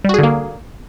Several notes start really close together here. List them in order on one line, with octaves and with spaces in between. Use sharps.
G3 F#4 G#4 D3 A#3